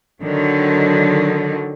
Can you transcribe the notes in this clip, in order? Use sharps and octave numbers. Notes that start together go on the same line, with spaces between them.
D3 D#3 F#3